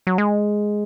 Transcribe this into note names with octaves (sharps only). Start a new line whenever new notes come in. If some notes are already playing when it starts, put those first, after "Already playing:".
F#3
G#3